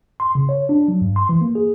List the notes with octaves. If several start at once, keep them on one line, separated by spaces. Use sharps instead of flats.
C6
C#3
C#5
D4
F#3
G2
C6
E3
A#3
G#4